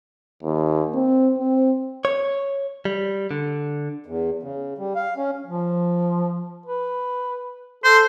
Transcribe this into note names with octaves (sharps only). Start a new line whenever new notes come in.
D#2
C4
C4
C#5
G3
D3
E2
C#3
G3
F5
C#4
F3
B4
A4 C5